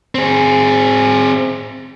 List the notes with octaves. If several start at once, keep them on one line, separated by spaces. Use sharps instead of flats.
C4 G#4